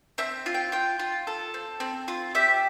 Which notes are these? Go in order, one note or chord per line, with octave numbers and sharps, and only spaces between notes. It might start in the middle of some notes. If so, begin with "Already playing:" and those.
C4 E5
F4
G5
F4 G5
F4
A4
C4
C4
F4
G4 E5